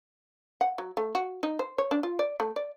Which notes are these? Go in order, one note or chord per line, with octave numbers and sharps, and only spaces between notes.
F#5
F#3
A3
F#4
D#4
C5
C#5
D4
F4
D5
A3
D5